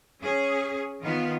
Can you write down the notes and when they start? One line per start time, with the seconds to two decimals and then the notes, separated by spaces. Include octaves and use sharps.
0.22 C#4 G#4
1.02 D#3 B3 F4